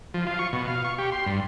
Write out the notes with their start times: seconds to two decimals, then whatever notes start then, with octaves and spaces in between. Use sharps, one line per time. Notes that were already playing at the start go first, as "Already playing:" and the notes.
0.14 F3
0.26 F4
0.39 C#6
0.53 B2
0.68 F5
0.84 C#6
0.98 G4
1.12 C6
1.26 G2